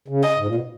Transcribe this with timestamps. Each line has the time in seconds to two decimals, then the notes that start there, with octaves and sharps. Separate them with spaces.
0.08 C#3
0.23 D#5
0.38 G#2
0.47 A#2
0.55 B2